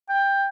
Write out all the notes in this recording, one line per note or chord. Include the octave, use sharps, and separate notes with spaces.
G5